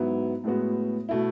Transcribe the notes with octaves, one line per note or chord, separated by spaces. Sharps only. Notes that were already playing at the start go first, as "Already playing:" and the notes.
Already playing: G#2 F#3 B3 E4
A2 G#3 B3 F#4
B2 A3 E4